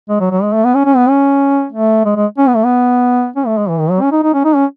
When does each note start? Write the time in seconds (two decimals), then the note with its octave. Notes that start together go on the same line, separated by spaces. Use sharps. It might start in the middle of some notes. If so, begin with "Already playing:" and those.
0.09 G#3
0.20 F#3
0.31 F#3
0.42 G#3
0.53 A3
0.65 B3
0.75 C#4
0.85 C#4
0.96 B3
1.08 C#4
1.72 A3
2.05 G#3
2.16 G#3
2.38 C#4
2.47 B3
2.56 A3
2.64 B3
3.36 C#4
3.47 A3
3.58 G#3
3.69 E3
3.80 D#3
3.91 F#3
4.02 C#4
4.12 D#4
4.23 D#4
4.34 C#4
4.45 D#4
4.55 C#4